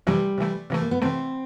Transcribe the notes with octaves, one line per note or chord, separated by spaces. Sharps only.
C3 E3 G3 A3
C3 E3 A3
C3 E3 A3
A#3
B3
C3 E3 A3 C4